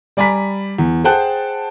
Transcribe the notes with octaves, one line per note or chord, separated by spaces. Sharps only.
G3 D5 G#5 A#5 B5 B6
E2
G#4 C5 F#5 G5 A5 F#6